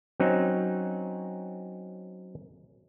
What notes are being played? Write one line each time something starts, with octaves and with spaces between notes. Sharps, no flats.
F#3 C4 C#4 D#4